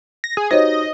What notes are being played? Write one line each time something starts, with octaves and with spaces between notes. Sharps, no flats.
A#6
G#4
D#4 F#4 G4 C5 C#5 D#5